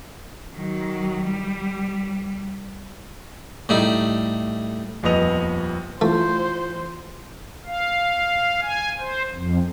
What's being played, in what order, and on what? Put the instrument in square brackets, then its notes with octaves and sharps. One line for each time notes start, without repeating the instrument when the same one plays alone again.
[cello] D#3 F#3
G3
[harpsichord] A2 G3 D#4
[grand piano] D#1 F2 B3 D#5 F7
[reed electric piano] E3 F4 [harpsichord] A3 [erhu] C5
[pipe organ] F5
G#5
C5
F2